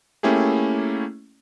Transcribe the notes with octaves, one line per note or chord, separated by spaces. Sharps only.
A3 A#3 C#4 E4 G4 G#4